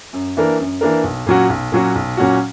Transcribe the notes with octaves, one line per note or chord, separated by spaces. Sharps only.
F#2
E3 A#3 D4 A#4
F#2
E3 A#3 D4 A#4
B1
A#2 F#3 C#4 F#4
B1
A#2 F#3 C#4 F#4
B1
A#2 F#3 C#4 F#4